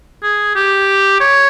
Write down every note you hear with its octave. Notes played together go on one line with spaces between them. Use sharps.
G#4
G4
C#5